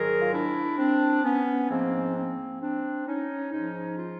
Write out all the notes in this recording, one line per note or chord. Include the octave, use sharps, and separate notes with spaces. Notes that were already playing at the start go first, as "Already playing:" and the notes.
Already playing: G#2 D#3 F#3 G#4 A#4
F4
D4 E4
C4 D4
B3 C#4
G#2 F3 A#3 C4
A#3 C4
C4 D4
C#4 D#4
G#2 F3 C#4 D#4
D#4 F4